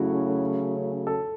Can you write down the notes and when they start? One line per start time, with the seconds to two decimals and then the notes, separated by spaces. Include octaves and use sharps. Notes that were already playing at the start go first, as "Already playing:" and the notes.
Already playing: C#3 F#3 A3 C#4 E4 F#4
1.07 A4